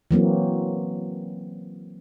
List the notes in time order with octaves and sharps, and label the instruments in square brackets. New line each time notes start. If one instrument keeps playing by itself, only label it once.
[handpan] E3 F#3 A#3 C4